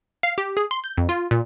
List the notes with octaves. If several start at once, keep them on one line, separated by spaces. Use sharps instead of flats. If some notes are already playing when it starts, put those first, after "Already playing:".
F5
G4
G#4
C6
G6
F2
F4
A#2